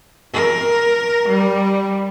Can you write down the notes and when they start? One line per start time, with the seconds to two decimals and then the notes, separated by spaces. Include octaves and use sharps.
0.34 A#4
1.28 G3